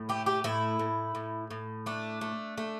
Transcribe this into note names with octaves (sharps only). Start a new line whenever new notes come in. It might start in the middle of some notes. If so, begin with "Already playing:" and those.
Already playing: A2
A3 G4
G4
A2 E4
A2
A2
A2
A3 D4
A3
A3